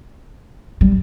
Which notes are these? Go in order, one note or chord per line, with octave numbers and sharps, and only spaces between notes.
G3